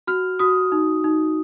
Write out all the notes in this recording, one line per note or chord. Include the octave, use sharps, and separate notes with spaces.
F#4 F6
F#4 D#6
D#4
D#4